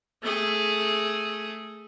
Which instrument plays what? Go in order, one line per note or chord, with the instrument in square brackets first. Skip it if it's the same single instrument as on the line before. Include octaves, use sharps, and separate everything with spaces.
[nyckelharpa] A3 G#4